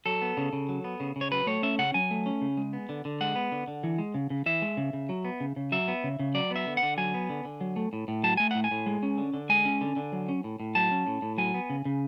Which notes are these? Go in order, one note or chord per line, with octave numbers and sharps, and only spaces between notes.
F#3 A4
B3
C#3
C#3
F#3
B3
C#3
C#3
C#5
F#3 B4
A3 C#5
C#4 E5
C#3 F#5
F#3 G#5
A3
C#4
C#3
G#3
B3
D3
D3
G#3 F#5
B3
D3
D3
E3
G#3
C#3
C#3
E3 E5
G#3
C#3
C#3
F#3
B3
C#3
C#3
F#3 E5
B3
C#3
C#3
F#3 D5
B3 E5
D3
F#5
D3
F#3 G#5
B3
D3
D3
F#3
A3
A2
A2
F#3 A5
A3 G#5
A2 F#5
G#5
A2
G#3
C#4
D3
D3
G#3 G#5
C#4
D3
D3
F#3
C#4
A2
A2
F#3 A5
C#4
A2
A2
F#3 G#5
B3
C#3
C#3